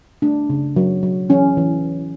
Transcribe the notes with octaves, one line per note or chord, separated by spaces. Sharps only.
A3 D4
C#3
F#3
F#3
E3 C#4
E3